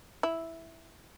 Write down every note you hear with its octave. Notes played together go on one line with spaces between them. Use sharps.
E4